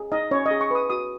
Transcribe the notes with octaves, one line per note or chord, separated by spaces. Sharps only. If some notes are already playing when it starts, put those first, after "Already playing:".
Already playing: G#4
D#4 D#5
C#4 C#5
D#5
G#4
C#6
B4 D#6
F#4 D#6